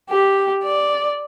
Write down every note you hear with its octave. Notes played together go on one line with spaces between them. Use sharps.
G4
D5